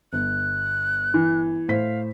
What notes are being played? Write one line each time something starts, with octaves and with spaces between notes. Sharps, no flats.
G1 F#6
E3
A2 C5 F5 B6